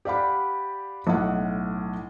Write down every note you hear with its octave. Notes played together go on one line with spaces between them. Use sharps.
G4 D5 F5 F#5 B5
B1 A2 F#5